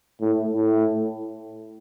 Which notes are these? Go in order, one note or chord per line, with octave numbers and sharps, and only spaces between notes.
A2
A2